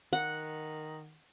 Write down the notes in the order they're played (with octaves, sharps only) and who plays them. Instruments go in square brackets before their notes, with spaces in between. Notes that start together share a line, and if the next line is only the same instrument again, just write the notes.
[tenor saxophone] D#3 [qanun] F#5